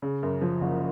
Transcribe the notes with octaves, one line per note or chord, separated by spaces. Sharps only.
C#3
F#2
F3
F#1